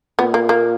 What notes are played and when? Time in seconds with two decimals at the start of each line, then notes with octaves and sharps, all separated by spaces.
0.19 A#2 B3
0.34 A#3
0.49 A#3